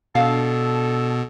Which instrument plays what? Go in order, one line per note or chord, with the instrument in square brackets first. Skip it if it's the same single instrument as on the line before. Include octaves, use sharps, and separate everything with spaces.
[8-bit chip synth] B2 [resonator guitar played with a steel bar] D4 F5 [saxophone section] A4